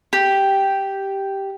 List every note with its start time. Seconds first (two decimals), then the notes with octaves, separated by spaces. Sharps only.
0.13 G4